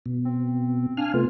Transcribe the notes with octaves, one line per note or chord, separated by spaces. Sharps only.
B2
C4
D4 F5 G#5 F6
C3 A3 B3 F4